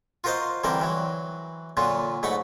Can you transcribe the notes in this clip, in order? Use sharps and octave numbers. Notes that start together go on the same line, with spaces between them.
F4 F#4 A#4 C5 D#5 F5
D3 E3 G3 C4 A#4 D5
E3 F#3
A#2 D3 F#3 F4
G#2 F#3 A3 F#5 B5